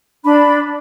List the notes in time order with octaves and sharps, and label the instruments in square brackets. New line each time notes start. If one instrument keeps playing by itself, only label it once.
[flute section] D4 B5